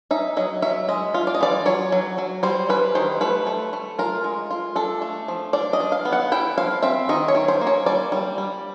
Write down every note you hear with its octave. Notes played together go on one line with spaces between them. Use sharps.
D#4 E5
F#3 D#5
F#3 E5
G#3 D#5
F4
D5
D#5
E3 D5
F#3 C#5
F#3
F#3
G3 C5
G3 B4
D#3 C5
A3 B4
A3
A3
F4 A#4
G#3
F4
D4 A4
A3
F3
D4 D5
D#5
D4
F5
B3
F#5
E4 G5
F3 F5
C4 E5
D#3 D#5
C#5
D#3
C5
A#3
C#5
G3 D5
G3
G3